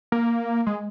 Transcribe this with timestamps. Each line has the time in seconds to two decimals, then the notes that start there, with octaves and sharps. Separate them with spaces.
0.12 A#3
0.67 G#3